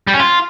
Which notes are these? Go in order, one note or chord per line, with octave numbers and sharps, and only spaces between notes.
G3
C#4
F4